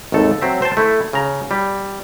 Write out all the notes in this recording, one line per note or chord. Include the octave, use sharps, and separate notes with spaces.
G#1 D#2 A3 A4
F#3 C4 E5
C5 G5 A5
A3 E4
C#3 A#5
G3